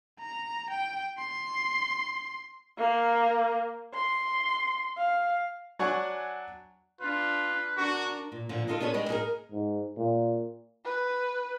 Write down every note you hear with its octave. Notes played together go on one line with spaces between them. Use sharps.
A#5
G5
C6
A#3
C6
F5
F#3 D4 F#5 G#5 C#6
D4 F4 B4
D4 F#4 A#4
A#2
A#2 D3 F3
G#3 B3 D#4 F4 A4 A#4
B3 D4 G#4 B4 C#5
G3 G#3 G4
D#4 G#4 A#4
G#2
A#2
B4